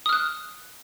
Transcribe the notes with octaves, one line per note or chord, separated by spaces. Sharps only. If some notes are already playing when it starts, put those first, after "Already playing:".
D#6 F6 F#6